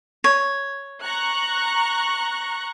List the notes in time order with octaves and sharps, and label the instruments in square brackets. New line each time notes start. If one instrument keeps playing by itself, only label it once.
[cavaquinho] C#5
[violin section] A#5 C#6 F#6